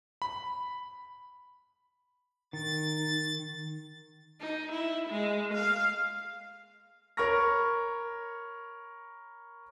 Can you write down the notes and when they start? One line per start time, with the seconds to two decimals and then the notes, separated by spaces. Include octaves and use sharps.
0.22 B5
2.53 D#3 A6
4.40 D#4
4.72 E4
5.10 G#3
5.54 F5
7.17 A#4 C#5 B5 C#6 F6 A#6